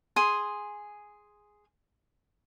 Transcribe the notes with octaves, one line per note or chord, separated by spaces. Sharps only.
G#4 G#5 C6 D#6